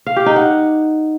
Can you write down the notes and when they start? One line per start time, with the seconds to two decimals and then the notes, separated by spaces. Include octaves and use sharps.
0.06 F5
0.16 G4
0.26 D#4
0.36 F#5